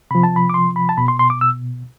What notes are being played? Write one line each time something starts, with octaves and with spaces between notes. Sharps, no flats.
C3 F3 B5
A5
B5
D6
C6
B5
A5
B2 B5
C6
C6
D6
E6